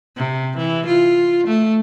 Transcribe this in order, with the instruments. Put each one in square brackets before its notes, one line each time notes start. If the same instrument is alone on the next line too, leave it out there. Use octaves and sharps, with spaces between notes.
[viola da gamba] C3
E3
F4
A3